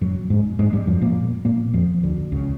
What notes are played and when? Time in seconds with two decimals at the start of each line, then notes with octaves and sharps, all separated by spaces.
0.01 F#2 F#3
0.30 G#2 G#3
0.59 G#2 G#3
0.73 G2 G3
0.87 F2 F3
1.01 A#2 A#3
1.45 A#2 A#3
1.74 F2 F3
2.03 D2 D3
2.32 C#2 C#3